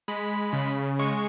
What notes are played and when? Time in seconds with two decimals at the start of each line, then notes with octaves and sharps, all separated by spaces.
0.08 G#3 B5
0.53 C#3
0.99 G#3 C#6